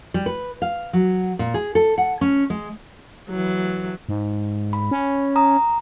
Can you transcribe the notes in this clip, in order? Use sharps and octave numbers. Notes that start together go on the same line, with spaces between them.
G3
B4
F5
F#3
A#2
G#4
A4
F#5
C#4
G#3
E3 F#3
G#2
B5
C#4
A#5 D#6